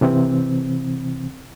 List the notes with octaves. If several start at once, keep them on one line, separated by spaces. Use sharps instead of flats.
C3 E3 C4